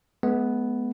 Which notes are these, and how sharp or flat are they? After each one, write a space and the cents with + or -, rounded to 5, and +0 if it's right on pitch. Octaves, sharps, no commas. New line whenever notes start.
G#3 +45 B3 +0